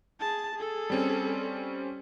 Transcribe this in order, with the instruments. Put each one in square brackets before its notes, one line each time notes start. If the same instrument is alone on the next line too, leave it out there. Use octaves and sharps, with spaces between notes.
[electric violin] G#4 A5
G#4 A4
[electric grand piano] G3 C4 C#4